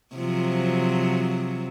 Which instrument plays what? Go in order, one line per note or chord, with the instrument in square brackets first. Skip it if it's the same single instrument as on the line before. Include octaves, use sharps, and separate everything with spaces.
[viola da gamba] C3 F3 F#3